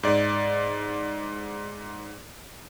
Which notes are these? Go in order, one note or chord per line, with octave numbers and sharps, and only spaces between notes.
G#2 D5